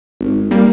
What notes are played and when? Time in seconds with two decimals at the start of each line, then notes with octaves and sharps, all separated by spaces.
0.21 G#1
0.51 G3 A#3